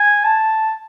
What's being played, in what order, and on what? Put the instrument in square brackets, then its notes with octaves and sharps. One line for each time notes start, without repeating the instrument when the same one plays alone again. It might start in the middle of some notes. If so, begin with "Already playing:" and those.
Already playing: [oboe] G#5
A5